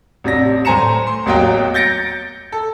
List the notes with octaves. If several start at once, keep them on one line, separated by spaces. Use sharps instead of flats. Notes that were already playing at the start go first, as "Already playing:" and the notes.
A1 C3 D4 A#6
A2 C5 G#5 A#5 C#7 E7
C6
A1 E2 F#3 A#3 D#5 G5
G6 A6 A#6 C#7 D7
A4